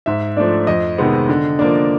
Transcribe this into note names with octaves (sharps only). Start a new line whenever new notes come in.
G#2 E5
F3 A3 D4 D5
F2 D#5
C3 D#3 G#3 B3
D3
F3 A#3 D4